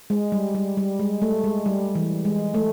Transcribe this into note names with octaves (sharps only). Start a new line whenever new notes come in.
G#3
G3
G3
G3
G#3
A3
G#3
G3
E3
G#3
A3